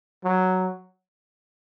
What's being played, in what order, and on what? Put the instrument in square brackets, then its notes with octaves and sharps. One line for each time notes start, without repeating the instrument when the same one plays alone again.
[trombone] F#3